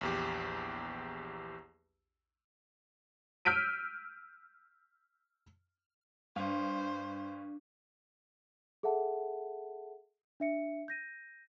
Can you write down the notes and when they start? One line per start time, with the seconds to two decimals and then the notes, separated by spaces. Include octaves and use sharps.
0.01 A#1 E2 G4
3.45 E6 F6 G6 B6 D7 D#7
6.36 G2 D4 C5
8.83 G#4 A4 E5 F#5 A5
10.40 D4 E5 C#7
10.88 G6 A#6 D#7